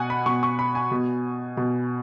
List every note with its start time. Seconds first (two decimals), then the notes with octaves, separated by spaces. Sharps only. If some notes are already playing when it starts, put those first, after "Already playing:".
Already playing: B2 F#5 G#5
0.10 B5
0.26 B2 C#6
0.43 C#6
0.59 B5
0.75 G#5
0.91 B2
1.57 B2